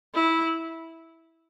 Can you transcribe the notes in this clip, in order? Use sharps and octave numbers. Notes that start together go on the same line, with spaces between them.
E4